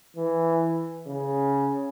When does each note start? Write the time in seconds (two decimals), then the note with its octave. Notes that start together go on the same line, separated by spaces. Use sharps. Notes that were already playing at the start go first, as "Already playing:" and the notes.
0.17 E3
1.07 C#3